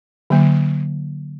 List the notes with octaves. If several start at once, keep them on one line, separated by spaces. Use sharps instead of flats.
D3 F#3 A#3